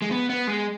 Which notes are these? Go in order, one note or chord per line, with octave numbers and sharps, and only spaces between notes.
G#3
B3
B3
G#3